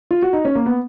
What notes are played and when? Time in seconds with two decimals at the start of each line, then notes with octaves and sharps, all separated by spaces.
0.11 F4
0.22 F#4
0.33 D#4
0.45 C#4
0.55 A#3
0.66 B3